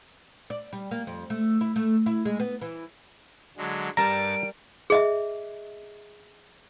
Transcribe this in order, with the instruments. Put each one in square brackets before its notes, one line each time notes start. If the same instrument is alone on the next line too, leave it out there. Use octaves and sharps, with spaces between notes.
[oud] D5
G3
A#3
F2
A3
E4
A3
E4
G#3
B3
E3
[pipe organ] D3 F#3 G#3
[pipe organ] G2 A6 [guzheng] G3 A#4 A5 [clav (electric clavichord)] A#5 [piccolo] D7
[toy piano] G#4 D#5 E5